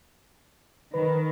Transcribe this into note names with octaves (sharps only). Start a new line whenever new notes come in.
D#3 B4